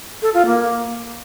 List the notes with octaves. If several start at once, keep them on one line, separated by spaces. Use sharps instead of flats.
A4
F4
A#3